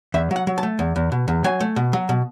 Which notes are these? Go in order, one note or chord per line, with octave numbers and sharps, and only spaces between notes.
E2 E5
F#3
F#5
F#3
A5
A3
E2
E2
B2
E2
F#3 G#5
A3
B2
F#3
B2